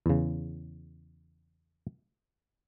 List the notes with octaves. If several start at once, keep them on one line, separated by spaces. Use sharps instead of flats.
E2 C#3